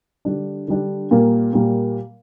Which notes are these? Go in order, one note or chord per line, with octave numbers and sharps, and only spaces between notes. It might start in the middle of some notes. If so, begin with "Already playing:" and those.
D3 G3 D4
D3 G3 D4
A#2 G3 A#3
A#2 G3 A#3